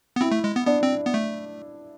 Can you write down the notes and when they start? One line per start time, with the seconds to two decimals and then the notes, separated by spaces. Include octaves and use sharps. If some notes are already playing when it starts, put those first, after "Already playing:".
0.16 B3
0.21 C4 E4
0.31 A3
0.44 G#3
0.56 B3
0.66 B3 D4
0.83 C4
1.06 B3
1.14 A3